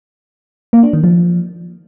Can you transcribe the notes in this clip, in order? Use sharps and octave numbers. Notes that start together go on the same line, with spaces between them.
A#3
D4
D#3
F3